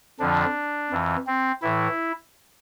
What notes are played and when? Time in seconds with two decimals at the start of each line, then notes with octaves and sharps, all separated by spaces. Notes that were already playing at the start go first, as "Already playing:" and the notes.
0.19 F2 D3 F3 D4
0.90 F2 E3
1.27 C4
1.62 A2 E3 E4